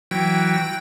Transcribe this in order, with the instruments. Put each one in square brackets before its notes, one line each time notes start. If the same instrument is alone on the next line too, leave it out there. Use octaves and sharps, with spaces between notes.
[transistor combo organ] E3 F#3 [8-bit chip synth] G5